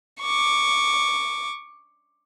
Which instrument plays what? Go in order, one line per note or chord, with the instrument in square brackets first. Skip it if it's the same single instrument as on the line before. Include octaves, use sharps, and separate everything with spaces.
[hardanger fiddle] C#6 D6